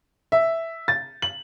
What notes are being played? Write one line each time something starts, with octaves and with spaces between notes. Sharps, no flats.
E5
A6
F#7